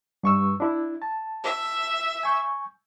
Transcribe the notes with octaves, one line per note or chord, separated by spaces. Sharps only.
G2 C#6 E6
D4 E4
A5
E5
G#5 C#6 G6